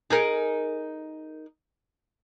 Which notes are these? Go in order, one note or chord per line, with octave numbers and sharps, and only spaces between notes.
D#4 G#4 A#4